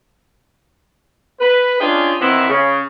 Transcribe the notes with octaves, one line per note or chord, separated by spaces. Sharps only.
B4
C#4 D4 F4 G#4 D#5 G5
D#3 E3 B3 C4 E4
C#3